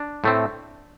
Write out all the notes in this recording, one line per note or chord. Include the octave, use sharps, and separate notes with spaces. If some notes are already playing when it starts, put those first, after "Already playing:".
Already playing: D4
A2 A3 C4